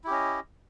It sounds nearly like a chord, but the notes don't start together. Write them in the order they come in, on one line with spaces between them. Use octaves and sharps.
E4 G4 C#4 D#5